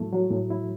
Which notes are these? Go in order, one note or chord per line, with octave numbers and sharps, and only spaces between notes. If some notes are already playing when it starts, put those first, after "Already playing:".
Already playing: A2 F#3 A3 E4
F#3
A2
E4